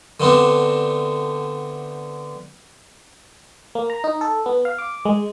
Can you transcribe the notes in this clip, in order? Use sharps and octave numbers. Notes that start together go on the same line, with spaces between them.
D3 A3 B3 C4 D4
A#3
A#5
D#4
A4
B3
F5
D6
G#3